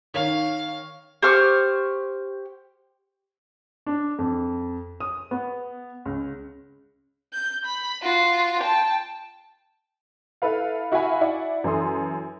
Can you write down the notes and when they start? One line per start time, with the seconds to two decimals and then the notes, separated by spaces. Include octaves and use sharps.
0.14 D#3 C#5 F5 F7
1.23 G4 C5 C#6 F6
3.86 D4
4.19 F2
5.00 D#6
5.31 B3
6.05 C#2
7.33 G6
7.65 B5
8.03 F4 F#4
8.60 G5 A5
10.42 E4 A4 B4 F5
10.92 E4 F#4 E5 F5 G#5 B5
11.21 E4 D5 F#5
11.64 F#2 E3 A4 C6 D#6